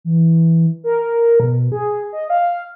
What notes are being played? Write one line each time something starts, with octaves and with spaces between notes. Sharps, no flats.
E3
A#4
B2
G#4
D#5
F5